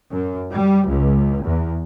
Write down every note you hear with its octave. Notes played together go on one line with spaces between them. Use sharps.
F#2
G3
C#2
E2